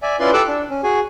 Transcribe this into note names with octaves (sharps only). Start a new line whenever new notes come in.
D5 E5 G#5
C#4 E4 F4 B4 D5 C6
G4 A4 D6 E6 F#6
D4
C#4
F#4 G#4 G#5